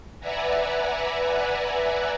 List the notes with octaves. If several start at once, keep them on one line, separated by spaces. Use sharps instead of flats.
B4 D5 E5 F#5 G#5 A#5